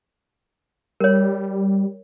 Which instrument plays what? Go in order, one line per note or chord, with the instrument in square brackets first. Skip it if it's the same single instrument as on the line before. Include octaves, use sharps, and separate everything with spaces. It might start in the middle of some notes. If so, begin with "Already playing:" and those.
[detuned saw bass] G3 [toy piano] A#4 C#5